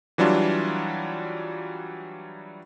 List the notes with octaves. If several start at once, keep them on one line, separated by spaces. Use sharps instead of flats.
E3 F#3 G3 D4 F4